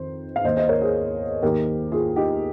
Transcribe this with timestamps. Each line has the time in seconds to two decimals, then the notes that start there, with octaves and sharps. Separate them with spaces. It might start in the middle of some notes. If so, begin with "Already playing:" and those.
Already playing: F2 D#3 C5
0.36 F5
0.44 D#2 D#3 C5 D#5
0.57 C5 D#5
0.69 A#4 C#5
0.81 G#4 C5
1.42 D#2 D#3 G4 A#4
1.92 F4 G#4
2.16 D#4 G4